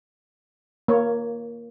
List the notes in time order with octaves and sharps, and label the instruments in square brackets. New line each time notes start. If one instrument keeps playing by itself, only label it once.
[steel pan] A#3 C#5